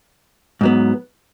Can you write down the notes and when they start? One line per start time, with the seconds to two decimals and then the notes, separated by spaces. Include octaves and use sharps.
0.61 G#2 F#3 B3